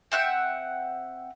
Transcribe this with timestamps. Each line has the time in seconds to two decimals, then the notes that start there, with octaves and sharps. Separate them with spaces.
0.12 C4 E5 F#5 G5